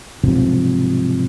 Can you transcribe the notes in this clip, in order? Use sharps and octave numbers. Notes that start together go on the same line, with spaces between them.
B1 G#2 C3 F3